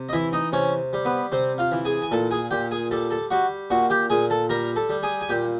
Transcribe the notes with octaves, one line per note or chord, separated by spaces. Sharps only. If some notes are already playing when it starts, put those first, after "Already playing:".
Already playing: C3
D#5
E3 E4 E5
D#4 D#5
C3 C#4 C#5
G3
B3 B4
C3 C4 C5
F4 F5
E3
G#4 G#5
G#5
A#2 A4 A5
G#4 G#5
A#2 G4 G5
G#4 G#5
G3 A4 A5
A4 A5
G3 F#4 F#5
A#2 F#4 F#5
G4 G5
A#2 G#4 G#5
A4 A5
G3 A#4 A#5
A4 A5
G3
G#4 G#5
G#5
A#2 G4 G5